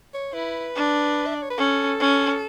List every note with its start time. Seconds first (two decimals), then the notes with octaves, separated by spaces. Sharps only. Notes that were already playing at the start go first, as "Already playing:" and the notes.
0.14 C#5
0.33 E4 B4
0.76 D4
1.26 E5
1.34 D5
1.42 C#5
1.50 B4
1.58 C#4 A4
2.00 C#4